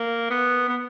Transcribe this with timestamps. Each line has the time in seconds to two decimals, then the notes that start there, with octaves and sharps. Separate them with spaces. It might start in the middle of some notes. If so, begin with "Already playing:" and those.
Already playing: A#3
0.30 B3
0.69 B3